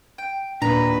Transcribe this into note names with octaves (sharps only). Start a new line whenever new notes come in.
G5
D#2 A#2 D4 B4 A#5